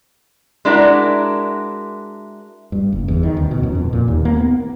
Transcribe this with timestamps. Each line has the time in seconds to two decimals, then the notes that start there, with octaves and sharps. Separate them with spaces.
0.65 G#3 D4 E4 F#4 A#4
2.72 G2
2.92 F#1
3.08 E2
3.23 D#3
3.37 D2
3.51 B2
3.63 F#2
3.75 F2
3.93 A#2
4.08 D#2
4.25 A#3
4.37 B3